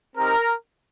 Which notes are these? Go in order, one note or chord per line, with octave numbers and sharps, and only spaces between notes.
C4 D#4 G4 A#4